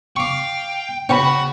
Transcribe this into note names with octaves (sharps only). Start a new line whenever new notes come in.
F5 G5 C#6 D6
C#3 C#4 F#4 C#5 F#5 G5 B5